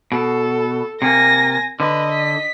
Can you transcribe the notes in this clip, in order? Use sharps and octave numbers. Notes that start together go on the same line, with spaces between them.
B2 A4
C3 A#3 G#5 A#6
D3 B4 D#5
B6